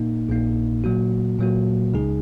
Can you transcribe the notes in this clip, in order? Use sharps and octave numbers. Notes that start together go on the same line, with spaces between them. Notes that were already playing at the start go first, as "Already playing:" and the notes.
Already playing: A#2 A#3 D#4
A#1 A#2 A#3 D#4
A#2 F#3 A#3 F#4
A#2 F#3 A#3 F#4
C#2 C#3 G#3 D#4 G#4